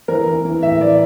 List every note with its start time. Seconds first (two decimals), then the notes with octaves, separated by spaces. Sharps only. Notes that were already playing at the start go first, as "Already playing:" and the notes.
0.08 E3 A#4
0.26 E3
0.45 E3
0.63 A2 E5
0.80 E3 D5